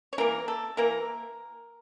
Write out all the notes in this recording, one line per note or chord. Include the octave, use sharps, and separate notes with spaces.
C#5
E3 A#3 A#4
A4
E3 A#3 A#4